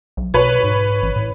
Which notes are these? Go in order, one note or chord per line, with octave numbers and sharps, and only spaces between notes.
B1
B2 B4 C#5
G#2
A1
A2